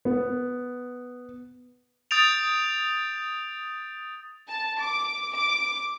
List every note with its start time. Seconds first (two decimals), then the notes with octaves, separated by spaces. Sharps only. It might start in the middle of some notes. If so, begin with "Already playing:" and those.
0.05 B3
2.11 D#6 G6 A6 D7 F7
4.48 A5
4.80 D6
5.33 D6